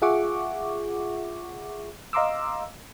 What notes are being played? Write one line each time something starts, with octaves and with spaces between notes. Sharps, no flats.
F4 G#4 E5 F#5 C#6 D6
D#5 F5 A#5 C6 D6 E6